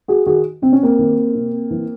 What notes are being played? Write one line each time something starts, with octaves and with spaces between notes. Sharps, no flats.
F#4 G#4
D#3 F#4 G#4
C3 C4
C#4
A#3 C4
D#3
C3
E3